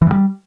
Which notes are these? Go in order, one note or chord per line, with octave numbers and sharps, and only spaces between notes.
E3
G2
G3